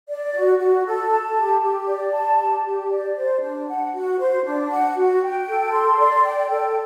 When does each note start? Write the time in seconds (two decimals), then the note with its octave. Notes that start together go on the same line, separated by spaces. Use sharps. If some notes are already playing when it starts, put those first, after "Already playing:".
0.08 D5
0.34 F#4
0.59 F#4
0.85 A4
1.10 A5
1.36 G4
1.62 G4
1.87 D5
2.14 A5
2.39 G4
2.65 G4
2.91 D5
3.16 C5
3.41 D4
3.67 F#5
3.93 F#4
4.19 C5
4.44 D4
4.70 F#5
4.95 F#4
5.22 G5
5.47 A4
5.72 C6
5.98 D5
6.24 G5
6.49 A4